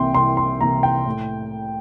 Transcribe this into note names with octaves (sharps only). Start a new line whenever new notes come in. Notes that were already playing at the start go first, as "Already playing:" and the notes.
Already playing: C2 C3 E3 A#3 G5 C6
C2 C6
C6
C3 E3 A#3 A#5
G5
A2